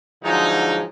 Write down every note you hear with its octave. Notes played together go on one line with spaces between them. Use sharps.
G#2 D3 F3 F#3 D#4